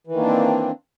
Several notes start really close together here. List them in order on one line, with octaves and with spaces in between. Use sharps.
E3 D#3 A#3 D4 C4